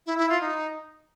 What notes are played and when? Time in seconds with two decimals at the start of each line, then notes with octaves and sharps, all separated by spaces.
0.06 E4
0.18 E4
0.30 F4
0.41 D#4